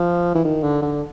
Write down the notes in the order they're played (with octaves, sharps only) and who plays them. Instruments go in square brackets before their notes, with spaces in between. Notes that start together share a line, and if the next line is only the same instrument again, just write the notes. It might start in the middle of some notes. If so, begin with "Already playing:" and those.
Already playing: [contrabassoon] F3
E3
D#3
D3
D3